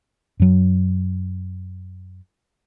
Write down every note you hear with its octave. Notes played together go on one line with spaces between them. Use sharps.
F#2 F#3